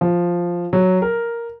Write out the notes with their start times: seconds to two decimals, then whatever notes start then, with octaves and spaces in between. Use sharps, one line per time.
0.01 F3
0.73 F#3
1.02 A#4